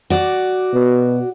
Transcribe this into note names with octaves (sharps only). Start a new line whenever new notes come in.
F#4 D5
B2